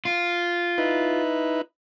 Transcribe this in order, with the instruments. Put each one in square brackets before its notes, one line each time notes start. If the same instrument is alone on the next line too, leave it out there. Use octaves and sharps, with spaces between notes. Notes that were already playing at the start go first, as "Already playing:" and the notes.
[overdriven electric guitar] F4
[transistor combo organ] D#4 E4 B4